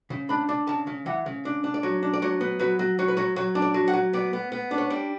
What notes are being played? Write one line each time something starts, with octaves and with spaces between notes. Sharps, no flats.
C#3
D4 B5
D4
C#3 A5
C#3
E3 F#5
C#3
D4
D4
D5
F#3 C#5
D4
D5
F#3 C#5
B3
F#3 B4
F#3
F#3 C#5
B4
F#3 C#5
F#3 C#5
D4
D5
F#3
F#5
F#3
B3 D5
B3
B3
D4
C#5
G3 D5